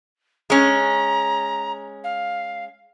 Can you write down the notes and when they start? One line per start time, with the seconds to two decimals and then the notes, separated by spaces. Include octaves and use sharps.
0.50 G#3 C#4 A#5
2.04 F5